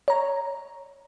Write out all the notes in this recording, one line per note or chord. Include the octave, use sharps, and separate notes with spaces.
C#5 A#5